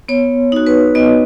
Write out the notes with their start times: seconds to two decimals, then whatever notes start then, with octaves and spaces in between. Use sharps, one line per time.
0.08 B3 C#5
0.52 D#4 F#4
0.66 B4
0.95 B3 D#5